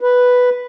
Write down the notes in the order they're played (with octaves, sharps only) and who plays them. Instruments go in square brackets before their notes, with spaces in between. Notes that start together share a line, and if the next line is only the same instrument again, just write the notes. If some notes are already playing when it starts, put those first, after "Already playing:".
[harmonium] B4